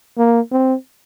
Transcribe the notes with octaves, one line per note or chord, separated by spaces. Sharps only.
A#3
C4